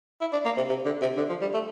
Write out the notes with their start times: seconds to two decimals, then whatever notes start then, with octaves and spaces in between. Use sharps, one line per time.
0.21 E4
0.33 D4
0.45 A#3
0.57 C3
0.69 C3
0.85 D3
1.01 C3
1.17 D3
1.29 F3
1.41 G3
1.54 A3